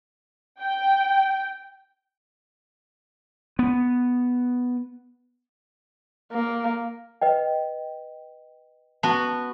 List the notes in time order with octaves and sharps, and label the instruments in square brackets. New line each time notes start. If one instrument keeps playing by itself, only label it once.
[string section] G5
[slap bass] B3
[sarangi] A#3
[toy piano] B4 D#5 G5
[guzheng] B3 F#4 [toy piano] A5